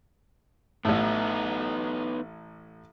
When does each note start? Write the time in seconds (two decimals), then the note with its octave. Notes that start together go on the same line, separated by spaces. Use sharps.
0.85 A1 A2 B3 D#4